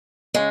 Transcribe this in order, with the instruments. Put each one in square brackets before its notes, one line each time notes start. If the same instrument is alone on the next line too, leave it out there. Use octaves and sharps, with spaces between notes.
[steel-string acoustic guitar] C#3 G#3